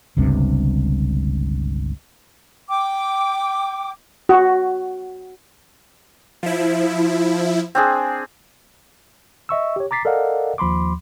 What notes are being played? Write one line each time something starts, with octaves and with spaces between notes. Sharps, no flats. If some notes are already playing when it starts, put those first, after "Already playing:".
G1 C#2 G2 C3
G5 D6
F#4
F3 E4
C4 D4 G#4
D#5 E5 C#6 E6
G4 C#5
A#5 D6 A6 B6 C7
A4 A#4 D5 D#5 F5 F#5
D#2 F3 B5 C6 D6